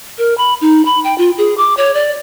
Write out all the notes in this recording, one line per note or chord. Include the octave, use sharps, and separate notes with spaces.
A#4
B5
D#4
B5
G5
F4
G#4
D6
C#5
D5